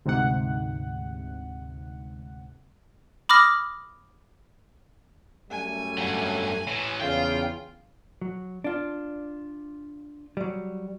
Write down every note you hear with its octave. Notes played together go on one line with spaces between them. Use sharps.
D2 G#2 C3 F#5
B5 D6 D#6 F6 A#6
F#2 G3 A3 G#5
G2 F#3
A2 E3
E2 C#3 F4 G5
F#3
D4 F4
F#3 G3